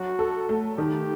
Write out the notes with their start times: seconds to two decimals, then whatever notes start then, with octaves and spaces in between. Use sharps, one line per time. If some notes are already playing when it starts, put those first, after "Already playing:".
Already playing: F#3 F#4
0.19 A4
0.49 A3
0.78 D#3 G4